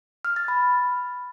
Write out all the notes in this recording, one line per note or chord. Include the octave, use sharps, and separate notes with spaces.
F6
A6
B5